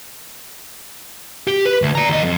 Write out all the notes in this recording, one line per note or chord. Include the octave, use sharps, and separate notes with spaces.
G4
B4
D2
D5 A#5
D#2 D#5
F2